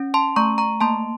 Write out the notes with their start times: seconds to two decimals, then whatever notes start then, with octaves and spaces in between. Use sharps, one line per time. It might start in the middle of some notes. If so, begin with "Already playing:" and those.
Already playing: C#4
0.14 A5 C6
0.36 A3 A#5 C#6
0.58 A#5 C#6
0.81 A#3 A5 C6